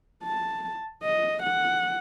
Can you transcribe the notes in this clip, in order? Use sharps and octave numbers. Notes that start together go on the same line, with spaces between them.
A5
D#5
F#5